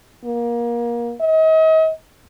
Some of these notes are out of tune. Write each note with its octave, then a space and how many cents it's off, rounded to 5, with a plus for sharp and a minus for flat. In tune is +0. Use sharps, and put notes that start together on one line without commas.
A#3 +25
D#5 +40